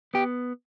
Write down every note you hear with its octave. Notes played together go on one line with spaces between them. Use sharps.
B3 G4